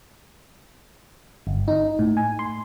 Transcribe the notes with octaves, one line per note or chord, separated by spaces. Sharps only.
G1
D#4
A2
G#5
C6